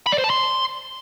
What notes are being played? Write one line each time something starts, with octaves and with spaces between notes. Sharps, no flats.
B5
D5
C5
A5
C6